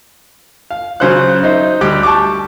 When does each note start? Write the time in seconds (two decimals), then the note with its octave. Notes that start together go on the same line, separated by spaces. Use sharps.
0.71 F5
1.00 C#3 F#3 C#4 C5 C#5 F#6
1.43 D#4 C5 E5
1.81 D2 G3 G4 D6 F#6
2.03 A5 C#6 D6